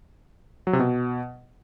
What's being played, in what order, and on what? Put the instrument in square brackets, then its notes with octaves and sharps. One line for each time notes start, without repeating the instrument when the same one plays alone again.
[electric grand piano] F#3
C3
B2